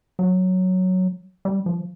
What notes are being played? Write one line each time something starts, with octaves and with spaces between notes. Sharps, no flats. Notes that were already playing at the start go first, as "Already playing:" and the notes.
F#3
G3
F3